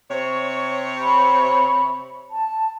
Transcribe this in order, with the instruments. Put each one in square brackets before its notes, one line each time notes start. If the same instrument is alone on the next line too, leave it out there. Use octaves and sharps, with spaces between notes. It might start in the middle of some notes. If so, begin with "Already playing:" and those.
[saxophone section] C3 C4 C#5
[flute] B5
A5